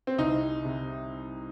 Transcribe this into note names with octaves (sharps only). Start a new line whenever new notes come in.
C4
C2 D#4
C3